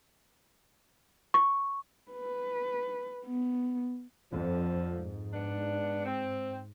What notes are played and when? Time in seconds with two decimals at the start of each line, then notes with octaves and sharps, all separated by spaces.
1.34 C#6
2.11 B4
3.25 B3
4.31 F2 D3 F3
4.95 G#2
5.33 B3 D4
6.06 C4